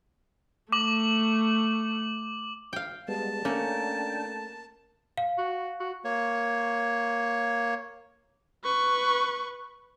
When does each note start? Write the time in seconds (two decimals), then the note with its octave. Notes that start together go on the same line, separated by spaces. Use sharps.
0.72 A3 D6 F#7
2.73 F5 G5
3.08 G3 G#3 B3 A5
3.45 A3 A#3 C#4 D4 G5
5.18 F5
5.38 F#4
5.80 F#4
6.05 A#3 C#5
8.64 B4 C#6